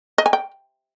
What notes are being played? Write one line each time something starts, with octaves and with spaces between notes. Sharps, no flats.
D#5
G#5
G5